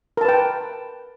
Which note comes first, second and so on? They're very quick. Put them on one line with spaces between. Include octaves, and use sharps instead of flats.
A#4 A5 B4 G5